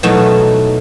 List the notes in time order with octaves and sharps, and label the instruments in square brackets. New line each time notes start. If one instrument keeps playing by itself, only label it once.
[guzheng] B2 E3 F#3 A3 D#4